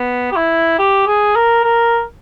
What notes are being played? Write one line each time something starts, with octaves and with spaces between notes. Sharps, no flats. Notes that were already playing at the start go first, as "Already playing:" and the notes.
Already playing: B3
G4
E4
G4
G#4
A#4
A#4